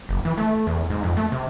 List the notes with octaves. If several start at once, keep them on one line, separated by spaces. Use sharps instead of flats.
F#1
E3
A3
E2
G#2
F2
A3
C3